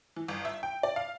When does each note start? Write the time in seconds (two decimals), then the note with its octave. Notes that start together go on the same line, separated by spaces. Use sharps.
0.16 E3
0.28 G1
0.45 E5
0.63 G5
0.83 D5
0.96 F5